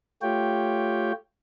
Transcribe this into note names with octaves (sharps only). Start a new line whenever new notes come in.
A3 F4 G4 C#5 G5